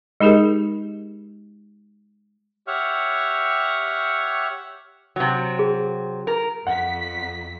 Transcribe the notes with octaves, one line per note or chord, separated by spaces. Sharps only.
G#3 D#4 G4 G#4 A#4
G4 C#5 E5 F#5 C#6 F6
C3 F#3
G#4
A#4
F2 F#5 B6